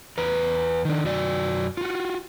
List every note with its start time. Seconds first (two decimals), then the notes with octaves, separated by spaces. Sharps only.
0.18 E2 B4 A#5
0.85 D#3 D4
1.05 F#2 F#4 D5
1.77 F4 F#4